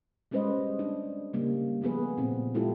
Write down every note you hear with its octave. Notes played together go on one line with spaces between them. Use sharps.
G3 G#3 C#4 B4 C5 D#5
D4
C#3 G3 A#3
F3 A3 B3 G#4 B4
A#2 C4
G#3 E4 F4 G4 A4